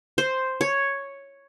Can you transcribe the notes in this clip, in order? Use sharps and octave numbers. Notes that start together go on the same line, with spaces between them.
C5
C#5